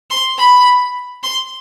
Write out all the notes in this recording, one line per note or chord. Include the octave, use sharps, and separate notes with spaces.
C6
B5
C6